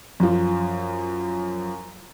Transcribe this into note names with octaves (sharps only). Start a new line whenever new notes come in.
F#2 F3